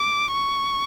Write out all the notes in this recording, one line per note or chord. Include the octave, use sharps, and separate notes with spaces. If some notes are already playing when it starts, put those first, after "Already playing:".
Already playing: D6
C#6